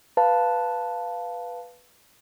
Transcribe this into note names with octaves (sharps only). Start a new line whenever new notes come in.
B4 F5 A5